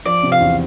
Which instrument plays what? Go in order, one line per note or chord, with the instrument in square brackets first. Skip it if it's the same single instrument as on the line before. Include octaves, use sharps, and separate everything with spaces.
[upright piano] F3 [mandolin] D5
[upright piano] C3
[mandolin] F5
[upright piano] E2